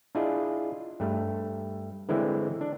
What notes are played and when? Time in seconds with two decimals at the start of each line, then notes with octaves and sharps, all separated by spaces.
0.15 D4 E4 F4 G#4 D#5
1.00 G2 A3
2.09 D3 E3 G#3 C4 E4
2.61 D4